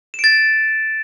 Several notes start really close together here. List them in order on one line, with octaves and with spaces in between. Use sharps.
E7 D7 A6